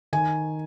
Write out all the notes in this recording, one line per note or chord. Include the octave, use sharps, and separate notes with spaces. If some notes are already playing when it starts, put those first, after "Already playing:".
D#3 G#5